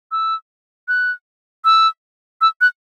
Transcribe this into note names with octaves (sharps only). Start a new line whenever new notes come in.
E6
F#6
E6
E6
F#6